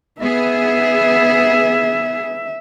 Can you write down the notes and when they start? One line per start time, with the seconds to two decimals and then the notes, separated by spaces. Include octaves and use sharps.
0.21 B3 G#4 E5